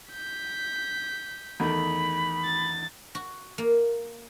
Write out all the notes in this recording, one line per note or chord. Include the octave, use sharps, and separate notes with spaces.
G6 B6
E2 D#3 A3 B5
A6
F#4
A#3